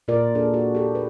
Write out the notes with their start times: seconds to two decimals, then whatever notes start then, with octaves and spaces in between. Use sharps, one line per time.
0.08 A#2 A#3 F4 A#4 D5
0.35 D4 G#4 A4
0.54 F#4
0.75 G4 A4
0.95 B4